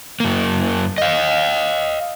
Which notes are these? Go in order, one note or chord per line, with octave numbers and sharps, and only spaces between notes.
F#2 A#3
D#5 F5